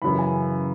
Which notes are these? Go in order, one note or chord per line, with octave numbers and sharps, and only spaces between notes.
F#2 C#3 E3 B5
G#5